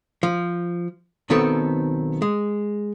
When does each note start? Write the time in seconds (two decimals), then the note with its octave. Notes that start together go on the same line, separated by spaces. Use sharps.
0.23 F3
1.30 B1 D#3 B3 C4 A4 C#5
2.22 G#3